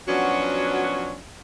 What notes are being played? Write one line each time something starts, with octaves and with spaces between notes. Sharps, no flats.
F3 F#3 B3 C#4 D4 F#4